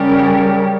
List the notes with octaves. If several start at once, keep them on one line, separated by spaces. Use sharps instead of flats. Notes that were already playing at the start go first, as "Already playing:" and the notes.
Already playing: C#3 G3 C#4 G4 A#4